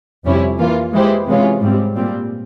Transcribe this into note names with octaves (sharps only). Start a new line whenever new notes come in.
F2 C3 G3 C#4 E4
E3 A#3 F4
E3 G#3 E4 G4 C5
C3 E3 G#3 C#4 F4
G#2 G3 C4
A#2 G3 C4